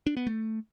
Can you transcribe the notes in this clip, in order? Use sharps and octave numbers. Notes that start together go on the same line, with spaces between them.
D4
B3
A3